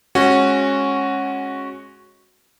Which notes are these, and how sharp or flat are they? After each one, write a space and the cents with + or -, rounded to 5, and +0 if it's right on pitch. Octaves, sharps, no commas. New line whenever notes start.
G#3 +0 C#4 -15 F#4 +0